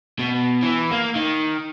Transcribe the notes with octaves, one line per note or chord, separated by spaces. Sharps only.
B2
E3
A#3
D#3